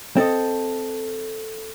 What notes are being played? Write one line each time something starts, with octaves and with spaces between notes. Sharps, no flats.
C4 A4 D#5